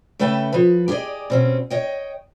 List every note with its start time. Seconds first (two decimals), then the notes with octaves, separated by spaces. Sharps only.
0.19 C#3 A3 B4 E5 G5 A5
0.53 F3 B4
0.88 G4 G#4 C5 D5 D#5
1.30 B2 C4 C#4
1.70 C#5 D#5 G5